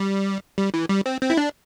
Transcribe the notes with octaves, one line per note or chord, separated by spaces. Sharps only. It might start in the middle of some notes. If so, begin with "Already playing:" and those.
Already playing: G3
G3
E3
G3
C4
C4
E4
D4